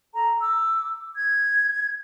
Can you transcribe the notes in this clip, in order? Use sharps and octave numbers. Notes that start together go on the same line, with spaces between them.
A4 A#5
D6 E6
G#6